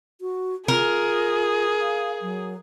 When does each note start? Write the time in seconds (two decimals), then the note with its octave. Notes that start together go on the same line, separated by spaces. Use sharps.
0.21 F#4
0.68 F4 G#4 A#4
1.81 F5
2.22 F#3